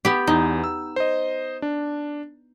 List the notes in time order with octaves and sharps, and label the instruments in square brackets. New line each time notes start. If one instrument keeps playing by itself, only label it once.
[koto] B3 G4
[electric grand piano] E2 [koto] D#4
[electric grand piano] E6
C5 D#5
D4